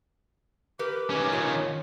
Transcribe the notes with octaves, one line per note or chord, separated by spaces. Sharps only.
G4 A#4 B4 D6
D#3 C#4
F4 C#5